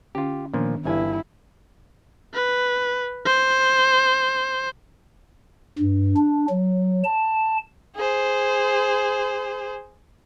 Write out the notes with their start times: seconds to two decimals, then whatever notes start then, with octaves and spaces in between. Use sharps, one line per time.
0.15 D3 C#4 F4 G4
0.54 A#2 D#3 F3 B3 D4
0.85 G1 G2 E3 E4 G#5
2.33 B4
3.25 C5
5.78 G2
6.16 D4
6.50 F#3
7.04 A5
7.96 G#4 C5